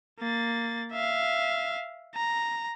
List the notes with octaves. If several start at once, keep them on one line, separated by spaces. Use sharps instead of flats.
A#3 A6
E5 F5
A#5